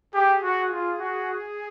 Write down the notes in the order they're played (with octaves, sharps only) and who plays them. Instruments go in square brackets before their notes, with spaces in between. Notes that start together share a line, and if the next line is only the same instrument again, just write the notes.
[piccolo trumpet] G4 [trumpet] G#4
[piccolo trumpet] F#4
F4
F#4